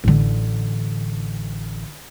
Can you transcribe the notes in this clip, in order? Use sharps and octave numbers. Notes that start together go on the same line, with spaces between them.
A1 D3